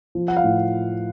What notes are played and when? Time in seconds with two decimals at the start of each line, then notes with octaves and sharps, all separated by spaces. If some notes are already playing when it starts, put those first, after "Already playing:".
0.15 F3
0.28 F#5
0.37 F5
0.44 A2